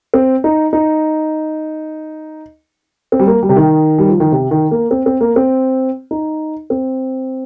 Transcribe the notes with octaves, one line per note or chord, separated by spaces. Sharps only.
C4
D#4
D#4
C4
G3
A#3
G3
C3
D#3
G3
F3
D#3
C3
D#3
A#3
C4
C4
A#3
C4
D#4
C4